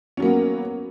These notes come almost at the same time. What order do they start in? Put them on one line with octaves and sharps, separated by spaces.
C#4 F#3 A#3 B3